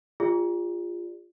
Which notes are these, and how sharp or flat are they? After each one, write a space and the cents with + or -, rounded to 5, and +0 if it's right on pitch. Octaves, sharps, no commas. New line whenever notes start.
F4 +0 G#4 -45 D5 +0